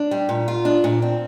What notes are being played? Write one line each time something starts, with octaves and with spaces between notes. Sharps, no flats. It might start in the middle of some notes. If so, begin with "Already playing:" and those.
Already playing: D4
G3
A#2
F4
D4
A#2
C4